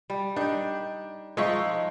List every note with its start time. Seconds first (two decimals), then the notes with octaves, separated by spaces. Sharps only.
0.10 G3
0.36 D4 D#4 G4
1.37 F3 G#3 D#4 E5 C#6